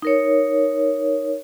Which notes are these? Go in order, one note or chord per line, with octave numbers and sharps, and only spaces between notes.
D#4 A#4 C#5